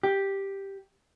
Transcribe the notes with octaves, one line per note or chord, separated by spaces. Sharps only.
G4